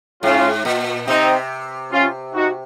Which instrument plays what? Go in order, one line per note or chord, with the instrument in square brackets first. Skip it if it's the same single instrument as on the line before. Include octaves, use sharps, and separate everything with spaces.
[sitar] G#2 [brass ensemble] C#4 F4
[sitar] A#2
[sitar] C3 [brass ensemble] C4 D#4
[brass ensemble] C#4 F4
D#4 F#4